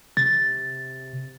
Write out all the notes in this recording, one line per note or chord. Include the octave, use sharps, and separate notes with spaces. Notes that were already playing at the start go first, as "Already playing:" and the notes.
C3 A6